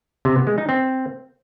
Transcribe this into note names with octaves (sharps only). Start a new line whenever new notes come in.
C3
B3
G#3
D#4
C4